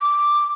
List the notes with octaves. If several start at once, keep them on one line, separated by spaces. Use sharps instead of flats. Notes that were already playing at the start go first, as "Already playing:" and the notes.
D6